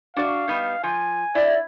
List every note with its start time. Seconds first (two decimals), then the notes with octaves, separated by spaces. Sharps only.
0.16 D4 F#4 D5 F5
0.48 G3 B3 D#4
0.83 F3 G#5
1.35 E4 D5